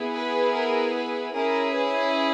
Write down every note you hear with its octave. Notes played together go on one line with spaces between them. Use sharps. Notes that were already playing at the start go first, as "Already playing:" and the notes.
Already playing: B3 E4 G#4
B4
A#4
B4
C#4 E4 G#4 A#4
B4